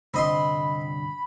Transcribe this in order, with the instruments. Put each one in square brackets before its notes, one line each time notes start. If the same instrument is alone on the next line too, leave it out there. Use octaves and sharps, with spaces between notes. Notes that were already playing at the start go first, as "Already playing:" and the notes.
[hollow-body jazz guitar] C2 G2 D3 [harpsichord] C4 D#5 C6 [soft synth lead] B5